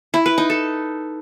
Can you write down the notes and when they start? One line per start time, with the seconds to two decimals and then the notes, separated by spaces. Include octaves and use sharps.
0.14 E4
0.26 B4
0.38 D#4
0.50 A4